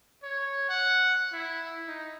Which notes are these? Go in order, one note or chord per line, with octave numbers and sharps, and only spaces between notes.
C#5
F#5
E4
D#4